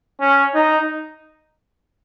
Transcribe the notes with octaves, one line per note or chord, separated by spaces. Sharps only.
C#4
D#4